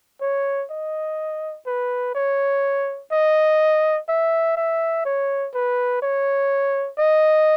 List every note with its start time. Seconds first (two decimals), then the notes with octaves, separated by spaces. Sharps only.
0.21 C#5
0.70 D#5
1.67 B4
2.15 C#5
3.12 D#5
4.09 E5
4.57 E5
5.05 C#5
5.54 B4
6.02 C#5
6.99 D#5